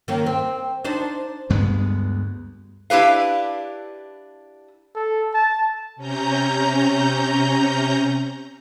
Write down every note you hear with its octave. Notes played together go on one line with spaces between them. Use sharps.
D#3 A#3 C#4
C4
D4 D#4 C5
D2 G2 G#3 B3
D4 E4 G4 B4 F5
A4
A5
C3 C#4 A#5 G6